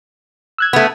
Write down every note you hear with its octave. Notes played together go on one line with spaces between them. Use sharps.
E6 F#6 G#6
A3 B3